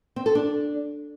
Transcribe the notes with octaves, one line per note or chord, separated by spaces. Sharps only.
C4
A4
D4